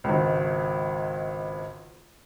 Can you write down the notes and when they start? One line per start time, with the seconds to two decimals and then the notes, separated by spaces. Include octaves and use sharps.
0.04 G#1 C#2